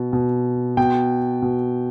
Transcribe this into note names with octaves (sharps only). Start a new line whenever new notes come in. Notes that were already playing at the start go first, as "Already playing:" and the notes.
Already playing: B2
B2
B2 G5
B2